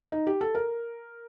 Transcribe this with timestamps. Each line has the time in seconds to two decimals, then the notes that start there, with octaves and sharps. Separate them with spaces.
0.12 D#4
0.27 G4
0.41 A4
0.55 A#4